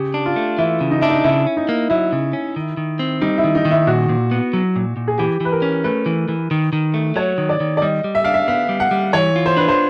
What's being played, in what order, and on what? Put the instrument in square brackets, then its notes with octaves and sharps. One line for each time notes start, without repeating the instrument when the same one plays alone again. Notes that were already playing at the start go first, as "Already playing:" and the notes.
Already playing: [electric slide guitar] C#3 [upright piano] G4
[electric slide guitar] D4
[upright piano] F4
[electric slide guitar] A3
[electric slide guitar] E3 [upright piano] E4
[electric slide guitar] C#3
[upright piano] D#4
[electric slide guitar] D4 [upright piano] E4
[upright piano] D#4
[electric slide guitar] C#3 [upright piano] E4
[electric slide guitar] C#4
[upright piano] D#4
[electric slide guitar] A#3
[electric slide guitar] F#3 [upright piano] E4
[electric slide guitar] C#3
C#4
D#3
D#3
C4
[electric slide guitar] G3 [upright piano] D#4
[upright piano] E4
[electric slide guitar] D#3
[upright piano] D#4
[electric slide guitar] D#3
[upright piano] E4
[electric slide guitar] A#2 [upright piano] F#4
[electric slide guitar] A#2
B3
F#3
A#2
A#2
[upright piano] G#4
[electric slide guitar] E3 [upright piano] G4
[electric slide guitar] E3 [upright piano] B4
[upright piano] A#4
[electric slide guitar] C#4
[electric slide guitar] A3 [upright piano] B4
[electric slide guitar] E3
E3
D#3
D#3
A3
[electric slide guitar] F#3 [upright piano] C#5
[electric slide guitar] D#3
[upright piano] D5
[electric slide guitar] D#3
[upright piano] D5
[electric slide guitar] G3 [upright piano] D#5
[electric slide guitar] G3
[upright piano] E5
[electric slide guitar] D4 [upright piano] F5
[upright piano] E5
[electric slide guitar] B3 [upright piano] F5
[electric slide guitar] G3
[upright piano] F#5
[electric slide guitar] G3
[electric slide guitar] E3 [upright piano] C#5
[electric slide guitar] F4
[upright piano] C5
[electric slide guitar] D4 [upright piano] B4
[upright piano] C5